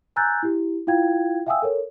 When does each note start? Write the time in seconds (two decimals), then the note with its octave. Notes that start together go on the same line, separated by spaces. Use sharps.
0.16 G#5 A#5 E6 F#6 G6 A6
0.43 E4 G4
0.87 E4 F4 F5 G5 G#6
1.47 E5 F5 G5 G#5 D#6 E6
1.62 A4 A#4 C#5